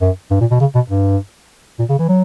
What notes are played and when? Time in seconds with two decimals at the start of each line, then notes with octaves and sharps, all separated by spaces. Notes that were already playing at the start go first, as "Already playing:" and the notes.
0.01 F#2
0.31 G2
0.41 A#2
0.51 B2
0.61 C#3
0.75 B2
0.90 G2
1.79 A#2
1.90 C#3
1.99 E3
2.09 F#3